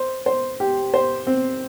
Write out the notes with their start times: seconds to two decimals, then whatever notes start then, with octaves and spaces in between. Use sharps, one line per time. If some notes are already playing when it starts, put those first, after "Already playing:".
Already playing: C5
0.26 C5
0.60 G4
0.94 C5
1.27 C4